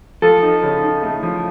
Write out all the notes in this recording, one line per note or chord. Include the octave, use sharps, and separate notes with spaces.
F3 A4
D#4
C#3
D#4
A3
F3